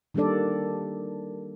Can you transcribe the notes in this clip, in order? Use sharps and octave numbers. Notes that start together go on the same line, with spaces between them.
D#3 G3 A#3 D4 A4 D5